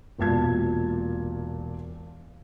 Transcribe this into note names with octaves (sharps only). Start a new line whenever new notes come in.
E1 A#2 A5 G#6